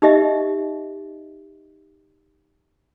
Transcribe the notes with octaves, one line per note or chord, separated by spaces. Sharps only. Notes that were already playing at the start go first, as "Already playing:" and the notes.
D#4 G4 D#5 E5